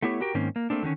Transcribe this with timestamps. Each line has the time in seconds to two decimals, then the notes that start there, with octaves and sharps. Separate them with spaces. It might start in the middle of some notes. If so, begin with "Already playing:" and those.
0.03 A3 B3 E4 G4 C#5
0.21 F#4 G4 A#4 G5
0.35 G#2 D#3 A#3 C4 C#4
0.56 A#3
0.70 A3 A#3 C4 D4
0.83 D3 D#3 F#3 C#4